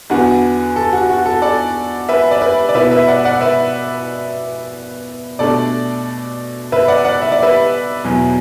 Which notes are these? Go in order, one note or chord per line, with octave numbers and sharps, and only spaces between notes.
E2 D3 B3 D4 F#4
A4
F#4
F#4
A4
A4 D5
B4 E5
D5
B4 E5
D5
B2 B3 E4 B4 E5
B4 E5
D5 F#5
D5 F#5
B4 E5
B2 A3 D4 A4 D5
B4 E5
D5 F#5
D5 F#5
E5
D5
B4 E5
E2 B2 F#3